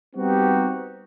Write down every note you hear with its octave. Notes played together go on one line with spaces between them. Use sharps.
G3 B3 C4 D#4 F#4 G4